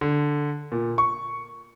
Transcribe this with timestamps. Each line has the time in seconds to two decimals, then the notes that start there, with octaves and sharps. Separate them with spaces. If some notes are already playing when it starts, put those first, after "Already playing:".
0.01 D3
0.72 A#2
0.98 C#6